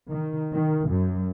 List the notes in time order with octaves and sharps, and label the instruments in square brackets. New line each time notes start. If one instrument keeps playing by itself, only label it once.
[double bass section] D#3
D#3
F#2